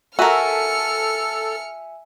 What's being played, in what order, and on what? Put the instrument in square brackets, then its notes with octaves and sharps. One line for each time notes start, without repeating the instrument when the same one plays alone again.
[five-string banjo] F#4 A#4 [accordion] A4 [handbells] E5 G#5 E6 [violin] F6 C#7